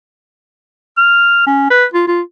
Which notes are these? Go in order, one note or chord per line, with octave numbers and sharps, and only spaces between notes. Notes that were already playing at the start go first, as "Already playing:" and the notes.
F6
C#4
B4
F4
F4